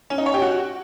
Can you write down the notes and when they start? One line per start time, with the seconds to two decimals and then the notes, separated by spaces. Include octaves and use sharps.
0.10 C#4
0.18 D#4
0.26 C#5
0.34 G4
0.42 F#4